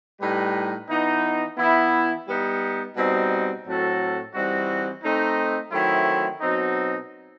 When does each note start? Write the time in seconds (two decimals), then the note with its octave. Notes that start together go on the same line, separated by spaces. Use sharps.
0.19 A2 G3 D#4 G4 B4
0.88 E3 B3 D#4
1.57 E3 B3 E4
2.27 G3 B3 D#4
2.95 B2 G3 C4 D#4
3.65 A2 F#3 C4 F#4 A4
4.34 E3 G3 C4 D#4 F#4
5.03 A3 C4 D#4
5.72 D#3 F#3 A3 C4 E4
6.41 B2 F#3 C4 D#4